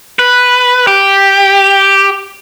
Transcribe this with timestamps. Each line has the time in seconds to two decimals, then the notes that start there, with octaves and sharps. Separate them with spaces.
0.19 B4
0.87 G4